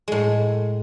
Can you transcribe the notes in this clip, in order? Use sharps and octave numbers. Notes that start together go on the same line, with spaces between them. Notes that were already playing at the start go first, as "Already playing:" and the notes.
A2 G#3